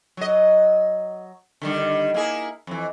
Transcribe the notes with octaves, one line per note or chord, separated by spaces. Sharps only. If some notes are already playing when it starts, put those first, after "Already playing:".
F#3 D#5
D3 D#3 G3
A#3 E4 G#4
F2 E3